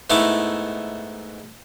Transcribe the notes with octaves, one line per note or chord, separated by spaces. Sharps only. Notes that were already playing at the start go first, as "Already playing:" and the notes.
G#2 A3 B3 D#4 E4 D6